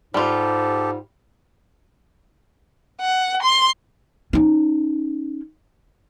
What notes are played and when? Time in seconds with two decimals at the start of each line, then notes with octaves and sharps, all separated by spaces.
0.14 G#2 G3 F4 G4 A4
3.01 F#5
3.43 C6
4.33 C#4 D#4